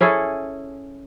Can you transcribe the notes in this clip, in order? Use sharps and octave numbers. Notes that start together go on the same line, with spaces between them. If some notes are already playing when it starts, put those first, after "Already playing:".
C#4 E4 G#4 A4